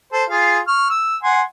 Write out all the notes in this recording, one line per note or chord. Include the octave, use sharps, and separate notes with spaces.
A4 C5
F4 G#4 F5
C#6 F6
E6
F#5 G#5 C6